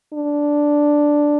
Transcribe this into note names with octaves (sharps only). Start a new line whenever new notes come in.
D4